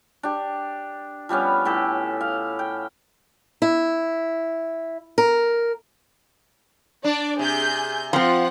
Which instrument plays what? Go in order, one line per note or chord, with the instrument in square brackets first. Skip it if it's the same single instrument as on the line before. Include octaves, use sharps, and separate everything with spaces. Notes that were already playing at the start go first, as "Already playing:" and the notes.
[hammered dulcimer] D4 G4
F3 G3 B3 C#4
A2 G4 A4
F5
G5
[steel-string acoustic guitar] E4
A#4
[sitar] D4 [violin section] D5
[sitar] C3 [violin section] G#4 G6
[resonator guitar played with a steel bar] F3 C4 [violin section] F4 F#5